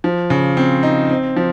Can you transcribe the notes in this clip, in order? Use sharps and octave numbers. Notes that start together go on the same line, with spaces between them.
F3
C#3
C4
D#4
C4
F3